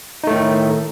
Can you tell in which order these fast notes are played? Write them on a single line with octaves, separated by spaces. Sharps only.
D#4 A3 A2 D#3